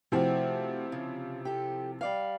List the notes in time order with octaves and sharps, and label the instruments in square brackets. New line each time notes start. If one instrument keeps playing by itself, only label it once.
[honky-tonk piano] C3 F3 E4 [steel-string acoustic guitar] A3 C4 F#4
[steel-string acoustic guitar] C#3
G4 A4
G3 D5 F5